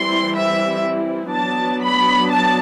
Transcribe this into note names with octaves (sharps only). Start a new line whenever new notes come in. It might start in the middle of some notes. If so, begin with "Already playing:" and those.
Already playing: E3 G3 C4 E4 C6
E5
F#3 B3 D4 A5
B5
A5